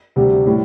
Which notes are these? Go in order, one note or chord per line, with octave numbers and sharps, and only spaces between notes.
D2 C3 G3 G4
A2 G3